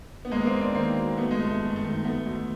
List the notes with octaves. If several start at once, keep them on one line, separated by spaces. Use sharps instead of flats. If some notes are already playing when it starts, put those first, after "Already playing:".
B3
D#2 G#3 A#3
B3
A#3 C4
D#2
C4 D4
D#3 A#3 C4
F#3
F#3 A3 B3
G#3
G1 A3
A3
F#2 A3
A3
D#3
D2 A3 B3
D2